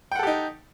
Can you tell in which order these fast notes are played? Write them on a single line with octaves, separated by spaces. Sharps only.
G5 F#5 A4 G4 D#4